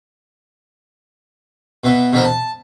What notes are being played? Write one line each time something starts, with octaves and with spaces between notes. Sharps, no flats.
B2 B3 E4 C6
B2 D3 E3 F3 E4 A#4
A5